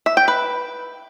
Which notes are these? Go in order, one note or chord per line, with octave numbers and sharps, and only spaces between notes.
E5
G5
B4